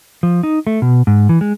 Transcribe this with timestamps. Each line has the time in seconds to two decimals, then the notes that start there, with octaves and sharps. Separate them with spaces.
0.23 F3
0.43 D#4
0.67 A3
0.82 B2
1.07 G#2
1.29 E3
1.41 G#3